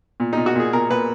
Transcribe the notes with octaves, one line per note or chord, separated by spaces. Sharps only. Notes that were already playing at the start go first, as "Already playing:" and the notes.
A#2
D#4
A#2
F#4
A#2 G#4
A#2 A#4
A#2 B4